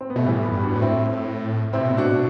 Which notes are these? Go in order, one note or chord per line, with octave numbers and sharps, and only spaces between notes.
C4
B3
B2 A3
A2 E3 G3
G3 B3
G2
D4 F#4
G2
A2
C4 E4
C3 C4 E4
B2
A2
B2 D4 F#4